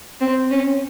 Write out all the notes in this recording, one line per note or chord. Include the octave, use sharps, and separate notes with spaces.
C4
C#4